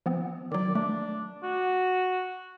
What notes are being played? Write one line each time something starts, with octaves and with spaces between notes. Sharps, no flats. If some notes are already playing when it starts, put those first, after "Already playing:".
F3 B3 C4
D#3 F#3 D5
A3 D4
F#4